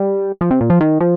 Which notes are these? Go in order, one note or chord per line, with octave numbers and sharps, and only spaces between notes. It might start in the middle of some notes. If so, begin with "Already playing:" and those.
Already playing: G3
F3
C3
A#2
F3
D#3
F3